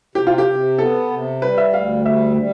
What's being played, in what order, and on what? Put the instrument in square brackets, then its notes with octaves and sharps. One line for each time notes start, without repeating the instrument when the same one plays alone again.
[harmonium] C3 [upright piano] G4
[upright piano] F4
G4
[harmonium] C3
[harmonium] B3 [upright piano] A4
[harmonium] C3
[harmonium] G3 [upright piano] B4
[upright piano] E5
[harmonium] D2 [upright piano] F5
[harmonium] G3 [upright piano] E5
[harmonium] G3